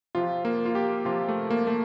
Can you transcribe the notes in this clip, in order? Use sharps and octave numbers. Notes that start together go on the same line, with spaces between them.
C3 F3 F4
A#3
F4
G4
C3 F3 F4
A3
A#3
A3